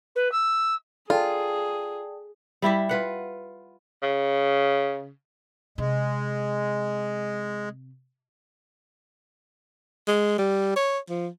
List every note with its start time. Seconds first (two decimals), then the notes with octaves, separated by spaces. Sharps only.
0.15 B4
0.31 E6
1.10 F4 G#4 A4 D5 G5 A5
2.62 G3 E4 G4 E5
2.89 F4 B4 F#5
4.03 C#3
5.78 C3 G#3
10.08 G#3
10.38 G3
10.76 C#5
11.09 F3